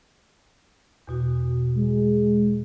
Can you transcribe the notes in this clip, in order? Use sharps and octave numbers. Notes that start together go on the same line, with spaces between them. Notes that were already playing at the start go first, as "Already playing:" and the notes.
E2 B2 F#4
G#3